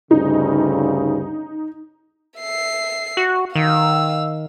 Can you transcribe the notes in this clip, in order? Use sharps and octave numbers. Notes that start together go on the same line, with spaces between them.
D2 G2 C#3 D#4
E5 C7
F#4
D#3 F5 E6